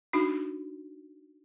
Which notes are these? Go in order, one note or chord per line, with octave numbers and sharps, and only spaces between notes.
D4 D#4 F#4